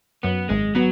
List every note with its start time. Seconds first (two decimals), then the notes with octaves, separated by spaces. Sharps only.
0.23 F#2 B3
0.49 G#1 G#3
0.75 F#3 B3